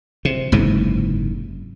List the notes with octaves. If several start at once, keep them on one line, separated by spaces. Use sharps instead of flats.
C3
F#1 G#2 C3 E3